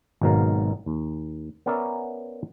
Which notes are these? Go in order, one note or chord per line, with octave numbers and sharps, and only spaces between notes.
G#1 G#2 B2 F#3 A#4 F5
D#2
B3 C#4 A#4 D5 E5